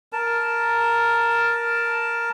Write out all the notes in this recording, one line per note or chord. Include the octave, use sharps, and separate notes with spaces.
A#4 A5